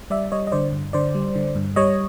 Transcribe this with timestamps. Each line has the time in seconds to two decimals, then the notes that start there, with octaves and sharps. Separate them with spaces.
0.10 G3 D5 E5
0.32 G3 C#5 D#5
0.47 D#5
0.52 D3 C5 D5
0.73 G2
0.93 D3 C5 D5
1.15 G3
1.36 D3
1.55 G2
1.76 G3 C#5 D#5